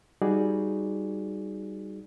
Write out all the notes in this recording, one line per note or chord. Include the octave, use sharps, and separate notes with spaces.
G3 D#4 F#4 G#4 D5